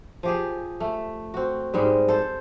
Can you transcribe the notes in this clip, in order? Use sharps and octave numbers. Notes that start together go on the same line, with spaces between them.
F3 G4 G#4
A3
C4 F#4
G#2 G3 G#3
A4 C5